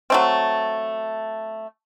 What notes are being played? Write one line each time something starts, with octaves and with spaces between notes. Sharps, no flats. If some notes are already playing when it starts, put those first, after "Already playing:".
F#3 A3 C4